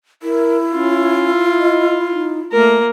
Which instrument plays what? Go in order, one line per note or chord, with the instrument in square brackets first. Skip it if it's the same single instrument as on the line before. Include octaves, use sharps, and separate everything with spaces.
[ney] E4 [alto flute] A#4
[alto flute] C#4 [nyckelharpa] F4
[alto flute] D#5
D#4
[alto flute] A3 [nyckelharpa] A#3 A#4